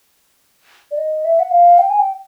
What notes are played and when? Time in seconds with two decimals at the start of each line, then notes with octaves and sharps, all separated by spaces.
0.91 D5
0.98 D#5
1.25 E5
1.40 F#5
1.51 F5
1.79 G5
1.90 G#5
1.99 G5